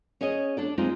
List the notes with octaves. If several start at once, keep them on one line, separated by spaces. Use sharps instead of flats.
C#4 G#4 C#5 D#5
D4 A4 D5
G#3 C4 D#4 F4 G#4